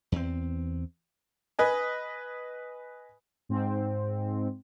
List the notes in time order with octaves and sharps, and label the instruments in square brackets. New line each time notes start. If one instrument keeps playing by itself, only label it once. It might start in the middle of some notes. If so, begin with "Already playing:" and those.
[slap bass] E2 C4
[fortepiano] B4 D#5 G#5
[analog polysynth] G#2 C4